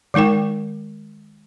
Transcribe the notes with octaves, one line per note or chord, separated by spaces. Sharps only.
D#3 G#3 D#4 A#4 G5